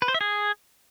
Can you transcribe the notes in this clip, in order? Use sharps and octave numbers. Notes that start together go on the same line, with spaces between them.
B4
C5
E5
G#4